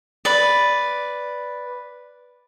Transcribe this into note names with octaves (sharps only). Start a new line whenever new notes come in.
B4 D5